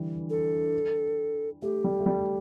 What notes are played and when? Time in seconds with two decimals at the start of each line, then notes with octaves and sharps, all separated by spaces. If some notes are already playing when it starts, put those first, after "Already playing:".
Already playing: D3 E3 G3
0.30 A4
1.62 A3 G4
1.84 G3
2.00 A3
2.06 G3